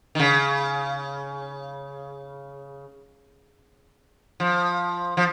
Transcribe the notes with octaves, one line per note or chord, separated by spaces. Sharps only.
D#3
C#3
F3
F3